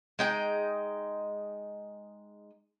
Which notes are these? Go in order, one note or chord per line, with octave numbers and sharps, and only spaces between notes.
G#3 D#4 G5